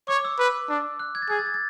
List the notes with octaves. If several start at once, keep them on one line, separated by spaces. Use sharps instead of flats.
C#5 D6
E6
B4
D4
F#6
G#6
A6
G#4 G#6
A6
G#6
A6